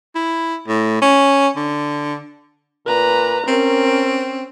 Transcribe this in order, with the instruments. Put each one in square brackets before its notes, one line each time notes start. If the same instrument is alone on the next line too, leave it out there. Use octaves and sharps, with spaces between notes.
[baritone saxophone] E4
A2
C#4
D3
[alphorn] A#2 [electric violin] B4 A#5
[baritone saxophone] C4 [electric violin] C#4 [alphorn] A#4